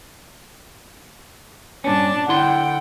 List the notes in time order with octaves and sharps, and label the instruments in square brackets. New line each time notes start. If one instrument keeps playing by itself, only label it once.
[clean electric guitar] G2 A#2 C#4 [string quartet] D4 A5
[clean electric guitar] D3 E4 C6 [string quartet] F#5 G5